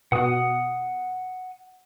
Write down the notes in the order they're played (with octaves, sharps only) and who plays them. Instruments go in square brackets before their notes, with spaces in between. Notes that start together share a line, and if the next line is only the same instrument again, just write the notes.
[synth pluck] B2 F#4 [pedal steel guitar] F#5 D#6